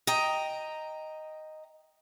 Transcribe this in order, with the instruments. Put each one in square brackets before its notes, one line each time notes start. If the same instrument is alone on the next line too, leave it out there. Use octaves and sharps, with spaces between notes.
[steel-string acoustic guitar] D#5 G5 A#5